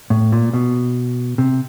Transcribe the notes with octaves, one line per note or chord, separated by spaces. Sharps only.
A2
A#2
B2
C3